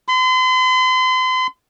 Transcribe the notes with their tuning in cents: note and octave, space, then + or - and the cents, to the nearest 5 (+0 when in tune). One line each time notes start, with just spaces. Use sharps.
C6 -40